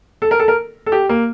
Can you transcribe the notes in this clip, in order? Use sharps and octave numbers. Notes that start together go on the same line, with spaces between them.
A4
A#4
A4
A#4
A4
G4
A#3